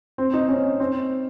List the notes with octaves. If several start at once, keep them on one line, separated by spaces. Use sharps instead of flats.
C4
D#4
C#4
C4